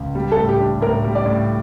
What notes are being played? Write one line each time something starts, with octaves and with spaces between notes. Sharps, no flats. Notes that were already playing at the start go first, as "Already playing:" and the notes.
Already playing: C#2
G3
A4
A2
G4
D4
A2 A#4
G3
D5
A2